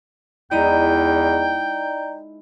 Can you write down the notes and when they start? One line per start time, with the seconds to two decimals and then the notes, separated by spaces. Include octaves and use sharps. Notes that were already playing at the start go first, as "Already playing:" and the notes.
0.51 E2 G#3 D#4 E4 D5 D#5 G5 A#5